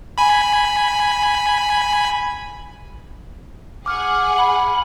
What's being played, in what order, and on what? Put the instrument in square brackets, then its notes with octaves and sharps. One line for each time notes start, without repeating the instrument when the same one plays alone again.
[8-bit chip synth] G#5 B5
[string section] G#4 F#5 G#5 [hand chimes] D6 F6
[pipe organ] B5